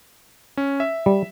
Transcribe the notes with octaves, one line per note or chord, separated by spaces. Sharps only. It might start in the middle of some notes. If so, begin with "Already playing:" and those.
C#4
E5
G3